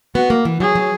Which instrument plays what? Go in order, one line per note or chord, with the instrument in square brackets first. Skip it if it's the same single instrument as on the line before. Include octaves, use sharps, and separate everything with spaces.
[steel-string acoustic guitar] B3 [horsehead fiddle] F#4
[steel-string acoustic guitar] A#3
E3
[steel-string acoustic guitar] F#3 [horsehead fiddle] G#4
[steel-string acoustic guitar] F#3